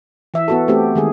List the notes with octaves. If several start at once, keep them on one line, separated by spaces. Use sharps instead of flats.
E3 E5
B3 F#4 A4
A3 C4 G4
D#3 G#3 G#4